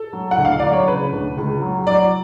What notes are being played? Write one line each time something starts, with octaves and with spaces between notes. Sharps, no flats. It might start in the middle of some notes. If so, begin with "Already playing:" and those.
Already playing: A4
F#3
F#5
D2
F5
F#3 D5
C#5
C#3 B4
D2
C#2
F#3
F#3 D5